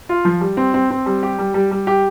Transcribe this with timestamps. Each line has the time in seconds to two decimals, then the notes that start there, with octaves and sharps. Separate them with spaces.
0.09 F4
0.25 F3
0.41 G3
0.57 C4
0.74 C4
0.91 C4
1.06 G3
1.23 G4
1.39 G3
1.54 G3
1.71 G3
1.87 G4